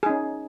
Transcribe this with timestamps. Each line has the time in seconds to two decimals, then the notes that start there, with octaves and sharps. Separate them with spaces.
0.03 G#4
0.06 D#4
0.10 C#4